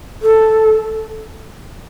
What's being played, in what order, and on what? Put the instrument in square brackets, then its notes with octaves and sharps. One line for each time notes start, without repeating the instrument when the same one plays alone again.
[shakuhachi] A4